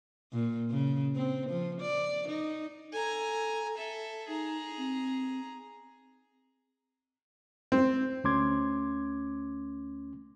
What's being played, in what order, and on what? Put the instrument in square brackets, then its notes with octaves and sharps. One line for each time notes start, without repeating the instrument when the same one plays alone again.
[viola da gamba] A#2
C#3
C4
F3
D5
D#4
[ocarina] A4 [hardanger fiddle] G#5 A#5
[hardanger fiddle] A4 E5
[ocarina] D#4 [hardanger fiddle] G#4 A#5
[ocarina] C4
[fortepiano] C4
[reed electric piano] D2 A3 C#4 C6 D6 G#6